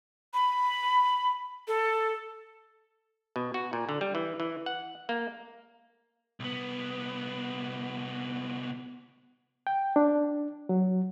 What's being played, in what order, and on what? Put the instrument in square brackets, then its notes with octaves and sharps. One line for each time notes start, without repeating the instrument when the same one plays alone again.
[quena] B5
A4
[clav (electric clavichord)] B2
F#4
A#2
D3
G3
E3
E3
F#5
A#3
[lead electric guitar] C2 B3
[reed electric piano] G5
D4
F#3